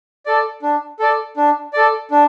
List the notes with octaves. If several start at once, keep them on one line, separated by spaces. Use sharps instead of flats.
A4 D5
D4
A4 D5
D4
A4 D5
D4